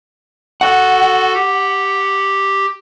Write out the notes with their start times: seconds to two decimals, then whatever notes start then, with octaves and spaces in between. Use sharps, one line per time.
0.61 F#4 A4 F#5
1.34 G4